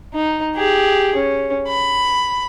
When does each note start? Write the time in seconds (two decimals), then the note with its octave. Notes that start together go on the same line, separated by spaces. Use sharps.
0.14 D#4
0.56 G4 G#4
1.15 C#4
1.68 B5